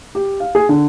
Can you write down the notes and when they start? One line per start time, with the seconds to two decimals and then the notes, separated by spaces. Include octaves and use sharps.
0.15 G4
0.40 F5
0.55 G#4
0.69 D3